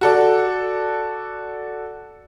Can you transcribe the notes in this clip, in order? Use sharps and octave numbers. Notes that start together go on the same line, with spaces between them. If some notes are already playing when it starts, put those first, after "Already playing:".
F#4 A4 D5